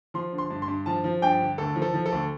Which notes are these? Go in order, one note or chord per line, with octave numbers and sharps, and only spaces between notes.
F3 C6
D3
C6
G2
C6
G2
F3 A5
F3
G2 G5
D3
D2 A4
F3
A4
F3
A4
D2